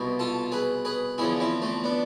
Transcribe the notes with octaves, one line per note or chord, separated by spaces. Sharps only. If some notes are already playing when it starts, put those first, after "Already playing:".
Already playing: C2 B2
F4 A4
G#4 B4
G#4 B4
E2 D3 F3 E4 G#4
C4 E4
A3 C4
B3 D4